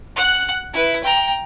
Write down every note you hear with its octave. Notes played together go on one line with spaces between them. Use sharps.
F#5 F#6
E4 B4
G5 A#5